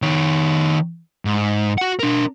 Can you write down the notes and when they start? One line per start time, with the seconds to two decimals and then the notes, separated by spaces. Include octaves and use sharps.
0.02 D#3 C#5
1.25 G#2
1.78 F#4 F#5
1.99 D4 A#4